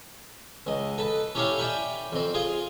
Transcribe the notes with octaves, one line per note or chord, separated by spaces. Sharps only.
C#2 D#5
A4 B4
C#4 E4 G4 A4 C#5 F5
D5 E5 G5 G#5 B5 C#6
F2 C4
F4 G#4 G#5 C6